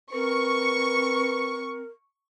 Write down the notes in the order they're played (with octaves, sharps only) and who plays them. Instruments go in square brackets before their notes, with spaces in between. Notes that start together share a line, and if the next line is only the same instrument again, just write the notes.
[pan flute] C4 [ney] A#4 [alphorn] B4 [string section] C#6